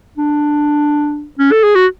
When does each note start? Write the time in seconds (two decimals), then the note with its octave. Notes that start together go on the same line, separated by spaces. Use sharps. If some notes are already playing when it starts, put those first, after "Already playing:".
0.17 D4
1.39 C#4
1.52 A4
1.64 G#4
1.76 F#4